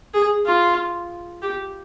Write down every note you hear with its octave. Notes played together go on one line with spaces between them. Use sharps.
G#4
F4
G4